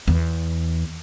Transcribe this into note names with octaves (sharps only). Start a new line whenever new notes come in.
E2